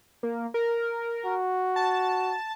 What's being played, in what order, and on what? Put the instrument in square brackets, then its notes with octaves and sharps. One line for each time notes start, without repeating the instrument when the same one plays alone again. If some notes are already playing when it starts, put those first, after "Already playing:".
[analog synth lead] A#3
A#4
[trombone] F#4
[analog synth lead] A5